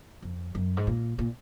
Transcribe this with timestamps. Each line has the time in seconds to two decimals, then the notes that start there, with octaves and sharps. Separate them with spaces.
0.22 F2
0.55 F#2
0.77 G#2
0.87 A#2
1.19 A#2